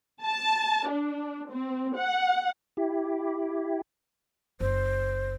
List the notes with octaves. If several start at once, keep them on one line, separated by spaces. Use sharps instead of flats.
A5
D4
C4
F#5
E4 G4
F#1 C5